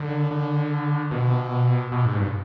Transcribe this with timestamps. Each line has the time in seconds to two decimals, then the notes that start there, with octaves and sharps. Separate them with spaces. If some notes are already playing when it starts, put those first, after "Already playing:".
Already playing: D3
0.31 D3
1.11 B2
1.92 B2
2.05 G#2
2.18 G2